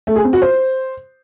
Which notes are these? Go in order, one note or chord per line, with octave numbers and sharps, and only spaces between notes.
A3
G#4
C4
F#4
C5